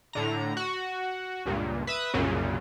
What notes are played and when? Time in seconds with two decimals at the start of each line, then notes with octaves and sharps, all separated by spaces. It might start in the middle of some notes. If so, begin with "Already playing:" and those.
0.13 A2 D3 A#5
0.57 F#4
1.46 C#2 G2 A#2
1.87 B4 E5 D#6
2.14 C2 F#2 A#2 C#3